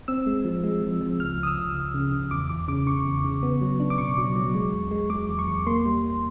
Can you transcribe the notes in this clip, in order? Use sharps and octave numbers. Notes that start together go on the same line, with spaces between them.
C4 E6
G#3
F3
G#3
F3
F3
C#2 F6
C#2
D#6
E6
C#2
C#2
C#3
C#3
E2 D6
E2 D6
C#3 D6
C#3 C#6
E2
C#3
B3
F#3
D4
D6
B2 C#6
F#3
F#3
G#3
E2
G#3
G#3 D6
E2
C#6
E2
A#3 C6
G3
A#3